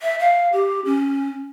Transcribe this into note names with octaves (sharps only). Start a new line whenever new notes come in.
E5
F5
G4
C#4